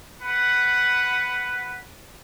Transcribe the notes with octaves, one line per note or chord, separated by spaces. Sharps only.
B4 F#5